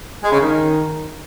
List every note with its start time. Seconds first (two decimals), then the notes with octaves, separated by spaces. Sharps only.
0.23 G#3
0.31 C#3
0.39 D#3